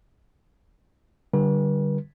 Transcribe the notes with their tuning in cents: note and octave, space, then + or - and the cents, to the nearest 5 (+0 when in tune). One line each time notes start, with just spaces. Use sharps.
D3 +0 G3 -15 B4 -40